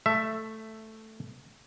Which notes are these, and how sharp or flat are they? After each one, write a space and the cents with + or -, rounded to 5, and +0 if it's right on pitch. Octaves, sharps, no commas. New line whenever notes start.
A3 +0 E5 +10